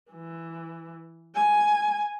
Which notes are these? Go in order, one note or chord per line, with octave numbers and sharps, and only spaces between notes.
E3
G#5